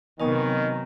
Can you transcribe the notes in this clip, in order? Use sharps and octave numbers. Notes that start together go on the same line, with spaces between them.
C3 D#3 F#3 B3 D#5 G#5 C#6